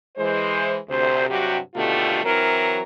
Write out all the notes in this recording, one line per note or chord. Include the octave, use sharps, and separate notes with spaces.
E3 G#3 C5
D2 C3 C5
G2 C3 F#3 F#4 G4
D#2 B2 D3 A3 F4 G4
E3 F#3 C4 E4 A#4